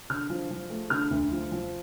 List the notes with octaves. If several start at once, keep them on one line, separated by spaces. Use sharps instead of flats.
D3 F6
F3
F3
A3
D3 F6
D2
F3
F3